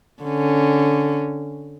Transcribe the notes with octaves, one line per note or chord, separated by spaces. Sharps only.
D3 C#4